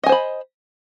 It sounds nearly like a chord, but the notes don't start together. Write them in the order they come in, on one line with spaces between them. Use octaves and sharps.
D#5 G#5 C5 B5